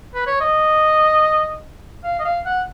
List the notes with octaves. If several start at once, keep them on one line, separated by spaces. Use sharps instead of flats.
B4
C#5
D#5
F5
D#5
F5
F#5